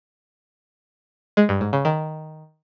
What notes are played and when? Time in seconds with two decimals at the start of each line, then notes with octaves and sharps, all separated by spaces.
1.37 G#3
1.49 G2
1.61 G#2
1.73 C#3
1.85 D#3